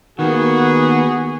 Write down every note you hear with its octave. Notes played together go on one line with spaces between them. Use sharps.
D#3 A#3 B3 F#4 G#4